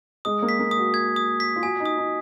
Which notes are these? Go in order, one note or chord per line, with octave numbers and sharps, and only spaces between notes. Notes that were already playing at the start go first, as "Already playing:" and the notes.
G#3 D#6
A#3
B6
A#3
D#6
F#4
G#6
D#6
B6
F4
F#4 G#5
D#4
D#6
D#4